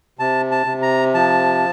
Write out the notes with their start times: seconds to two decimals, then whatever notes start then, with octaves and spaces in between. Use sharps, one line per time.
0.19 C3 A5
0.51 A5
0.66 C3
0.82 A#5
1.14 F3 A5